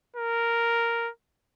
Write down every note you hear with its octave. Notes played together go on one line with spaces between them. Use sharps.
A#4